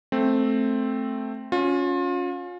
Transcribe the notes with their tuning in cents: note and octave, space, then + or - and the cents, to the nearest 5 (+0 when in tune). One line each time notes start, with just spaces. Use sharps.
A3 +0 C4 +5
C#4 +10 F4 +35